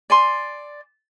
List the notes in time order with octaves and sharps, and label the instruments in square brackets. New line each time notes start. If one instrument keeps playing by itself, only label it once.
[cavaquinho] D5 G#5 C6